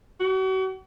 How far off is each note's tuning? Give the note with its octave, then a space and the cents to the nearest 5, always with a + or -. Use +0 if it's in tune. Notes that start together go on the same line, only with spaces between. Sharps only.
F#4 +40